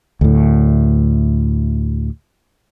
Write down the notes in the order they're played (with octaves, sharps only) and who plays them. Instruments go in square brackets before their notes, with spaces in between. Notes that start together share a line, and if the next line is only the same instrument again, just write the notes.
[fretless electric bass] D2 A2